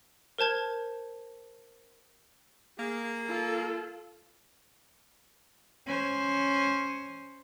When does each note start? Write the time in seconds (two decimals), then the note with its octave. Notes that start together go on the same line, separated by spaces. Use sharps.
0.38 A#4 C5 A5 G#6
2.79 A#3 G#4
3.28 F4 A4
5.86 C#4 C5